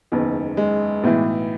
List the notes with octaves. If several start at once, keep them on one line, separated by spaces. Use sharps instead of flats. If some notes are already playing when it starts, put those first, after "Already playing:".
F#1 E2 D#3
G#3
B1 A2 E3